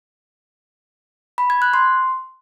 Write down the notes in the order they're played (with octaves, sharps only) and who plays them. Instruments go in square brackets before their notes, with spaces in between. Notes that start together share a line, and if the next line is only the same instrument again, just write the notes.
[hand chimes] B5
G#6
F#6
C6